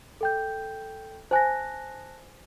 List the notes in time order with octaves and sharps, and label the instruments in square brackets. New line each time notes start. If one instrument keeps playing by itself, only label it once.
[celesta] A4 G5 G6
[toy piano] C5 G#5 [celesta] A5 F#6 A#6